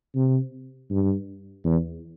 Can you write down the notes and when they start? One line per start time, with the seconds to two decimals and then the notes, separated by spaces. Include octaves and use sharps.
0.15 C3
0.91 G2
1.65 E2